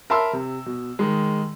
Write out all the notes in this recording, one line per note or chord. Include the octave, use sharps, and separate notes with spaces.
A#4 E5 A5 B5 C6 E6
C3
B2
D#3 G#3